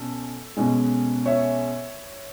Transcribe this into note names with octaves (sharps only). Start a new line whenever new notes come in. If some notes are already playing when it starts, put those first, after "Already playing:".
Already playing: B2 C#4 A4
B2 G#3 C#4
C#5 E5